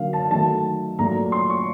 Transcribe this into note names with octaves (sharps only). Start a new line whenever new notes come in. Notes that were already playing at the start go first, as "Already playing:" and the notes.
Already playing: D3 F#3 A#3 F5
A5
D#3 F#3 A3 A5
A#2 F#3 A3 A#5
C6
C#6